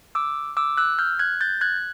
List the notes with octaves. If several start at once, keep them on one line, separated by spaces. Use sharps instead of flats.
D6 E6
D6 E6
E6 F#6
F6 G6
F#6 G#6
G6 A6
F#6 G#6